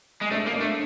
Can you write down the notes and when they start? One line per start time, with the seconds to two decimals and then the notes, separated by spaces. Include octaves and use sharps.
0.21 G#3
0.31 A3 D4
0.46 A#3
0.53 D4
0.61 A3